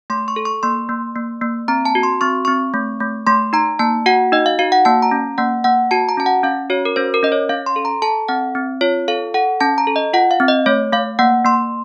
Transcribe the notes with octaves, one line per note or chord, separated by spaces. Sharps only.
A3 C6
C#6
A4
C#6
A#3 C6
A#3
A#3
A#3
C4 A#5
A5
F#4
C6
C4 C#6
C4 C#6
A3
A3
A3 C6
D#4 A#5
A#3 A5
F#4 F#5
D#4 D#5
F5
F#4 F5
F#5
A#3 A5
A#5
C#4
A#3 F#5
A#3 F#5
F#4 A5
A#5
C#4 A5
F#5
C#4 F5
F#4 C#5
A#4
C#4 C5
A#4
C#4 D#5
C#5
C#4 F5
C6
A4
A#5
A4 A5
C4 F#5
C4
F4 C#5
A4 F5
A4 F#5
C#4 A5
A#5
A4
D#5
F4 F#5
F5
C4
D#5
A3 C#5
A3 F5
A#3 F#5
A#3 C6